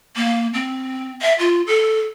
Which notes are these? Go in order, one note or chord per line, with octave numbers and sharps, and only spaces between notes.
A#3
C4
E5
F4
A4